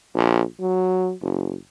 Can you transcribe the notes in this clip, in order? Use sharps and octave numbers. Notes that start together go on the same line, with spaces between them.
A#1
F#3
F#1